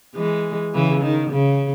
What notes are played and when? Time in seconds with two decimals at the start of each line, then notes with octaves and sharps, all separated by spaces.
0.16 E3 G#3
0.74 C#3 E3
1.03 D#3
1.31 C#3